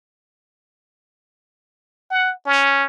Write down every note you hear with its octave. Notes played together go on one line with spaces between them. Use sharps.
F#5
C#4